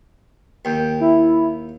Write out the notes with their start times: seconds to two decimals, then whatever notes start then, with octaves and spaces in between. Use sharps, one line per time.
0.65 D#2 G5
1.00 E4